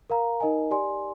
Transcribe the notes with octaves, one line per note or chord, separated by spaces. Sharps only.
A#4 F5 A#5
D#4 A#4 D#5 G#5
G4 D5 G#5 C6